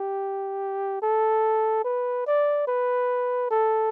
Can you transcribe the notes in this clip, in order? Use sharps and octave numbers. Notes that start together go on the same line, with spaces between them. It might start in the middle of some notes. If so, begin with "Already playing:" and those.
Already playing: G4
A4
B4
D5
B4
A4